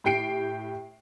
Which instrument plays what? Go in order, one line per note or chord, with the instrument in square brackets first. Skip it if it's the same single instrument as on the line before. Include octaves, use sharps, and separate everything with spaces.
[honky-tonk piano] A2 G4 G5 C7 D7